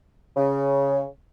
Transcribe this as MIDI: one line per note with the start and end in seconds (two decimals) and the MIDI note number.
0.37 1.00 49